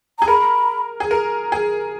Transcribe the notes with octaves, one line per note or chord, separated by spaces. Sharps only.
G#4 A#5
A#4 B5
G#4
A#4
G#4